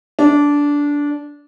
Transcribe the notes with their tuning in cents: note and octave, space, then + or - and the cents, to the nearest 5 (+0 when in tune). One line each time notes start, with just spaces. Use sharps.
D4 -15